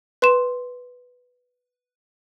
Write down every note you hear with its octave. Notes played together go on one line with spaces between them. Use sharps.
B4 C6 E7